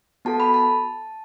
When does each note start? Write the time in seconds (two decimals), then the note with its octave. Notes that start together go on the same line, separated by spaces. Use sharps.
0.25 B3 F#4 A4 A5
0.40 B5
0.54 A5